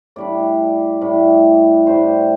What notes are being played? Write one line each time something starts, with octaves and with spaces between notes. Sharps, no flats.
A2 G3 D4 D5
A2 G3 D4
A2 G3 D4 C5